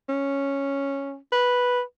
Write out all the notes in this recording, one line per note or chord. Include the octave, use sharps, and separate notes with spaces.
C#4
B4